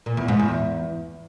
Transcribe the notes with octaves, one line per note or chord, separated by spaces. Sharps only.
A#2
E2
G#2
E2